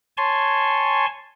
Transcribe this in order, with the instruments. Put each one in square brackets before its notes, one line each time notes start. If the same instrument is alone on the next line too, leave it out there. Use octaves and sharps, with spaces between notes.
[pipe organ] C#5 G#5 A5 C6 C#6